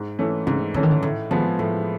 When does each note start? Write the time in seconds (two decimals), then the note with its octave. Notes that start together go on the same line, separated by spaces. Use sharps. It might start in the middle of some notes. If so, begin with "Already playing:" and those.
Already playing: G#2
0.19 E3 A3 C#4
0.47 G#2 C#3
0.74 D3 E3 A3 C#4
0.83 D#3
0.91 D3
1.03 A2 D3
1.31 D#3 F3 G#3 B3
1.59 A2 E3